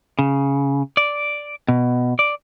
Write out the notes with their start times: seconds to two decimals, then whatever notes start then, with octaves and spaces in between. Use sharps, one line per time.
0.19 C#3
0.97 D5
1.68 B2
2.19 D5